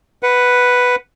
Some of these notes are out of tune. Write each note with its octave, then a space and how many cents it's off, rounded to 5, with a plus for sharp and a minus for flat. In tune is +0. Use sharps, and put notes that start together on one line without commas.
B4 +0 F#5 +0